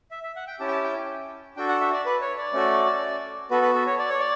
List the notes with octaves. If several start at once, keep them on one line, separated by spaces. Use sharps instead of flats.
E5
E5
F#5
G5
C#4 E4 G4 A5
G5
A5
G5
D4 F#4 A4 G5
F#5
E5
D5
B4
C#5
D5
A3 C#4 F#4 A4
B3 F#4 A4 B4
B4
A4
C#5
D5
C#5
D5